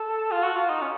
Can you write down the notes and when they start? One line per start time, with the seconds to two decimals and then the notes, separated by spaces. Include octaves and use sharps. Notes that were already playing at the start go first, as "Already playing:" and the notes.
Already playing: A4
0.31 F4
0.43 F#4
0.56 F4
0.69 D#4
0.82 C#4